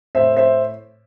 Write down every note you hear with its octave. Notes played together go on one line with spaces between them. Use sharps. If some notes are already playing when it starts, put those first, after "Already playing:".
A2 C5 E5
C5 E5